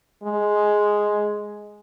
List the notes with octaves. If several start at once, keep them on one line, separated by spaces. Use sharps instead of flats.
G#3